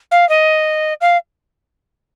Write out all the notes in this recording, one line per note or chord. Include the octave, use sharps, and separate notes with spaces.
F5
D#5
F5